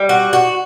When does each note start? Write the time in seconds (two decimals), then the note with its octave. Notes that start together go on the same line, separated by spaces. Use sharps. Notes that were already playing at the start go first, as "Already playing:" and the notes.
Already playing: G3
0.09 F#4
0.33 F#4